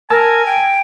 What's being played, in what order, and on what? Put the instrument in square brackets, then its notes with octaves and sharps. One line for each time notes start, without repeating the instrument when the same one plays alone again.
[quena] A#4 [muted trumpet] G#5 [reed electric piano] A5 E6
[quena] G5